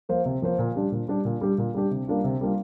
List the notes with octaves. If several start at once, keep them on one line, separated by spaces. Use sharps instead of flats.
F3 A#3 F4 C5
C3
F3 A#3 F4 C5
A#2
G3 D4 G4
A#2
G3 D4 G4
A#2
G3 D4 G4
A#2
G3 D4 G4
C3
G3 A#3 D4 F4
C3
G3 A#3 D4 F4